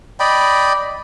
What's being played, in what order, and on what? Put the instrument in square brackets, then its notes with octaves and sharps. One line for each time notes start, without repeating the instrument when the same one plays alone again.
[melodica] D5 D#5 G5 B5